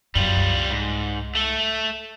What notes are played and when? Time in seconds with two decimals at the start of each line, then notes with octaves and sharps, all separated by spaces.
0.15 F#2 G3 F4
0.36 C2
0.71 G#2
1.35 A3 A4